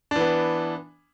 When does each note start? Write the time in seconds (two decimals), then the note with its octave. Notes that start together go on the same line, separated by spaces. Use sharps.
0.11 D4
0.16 E3
0.20 B3